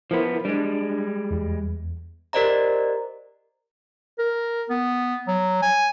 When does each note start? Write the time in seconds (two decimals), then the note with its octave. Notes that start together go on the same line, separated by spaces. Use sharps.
0.11 F3 B3 E4 A#4 C5
0.45 G3 G#3 D4
1.31 E2
2.33 G4 A#4 C5 D5 D#5 A#5
4.19 A#4
4.70 B3
5.28 F#3
5.62 G#5